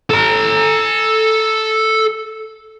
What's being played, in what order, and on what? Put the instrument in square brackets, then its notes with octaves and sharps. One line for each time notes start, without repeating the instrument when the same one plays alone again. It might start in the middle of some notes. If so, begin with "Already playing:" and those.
[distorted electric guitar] A4 A#5